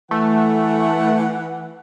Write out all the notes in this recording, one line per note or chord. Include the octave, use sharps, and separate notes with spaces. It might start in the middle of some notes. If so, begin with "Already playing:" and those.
E3 A3 F#5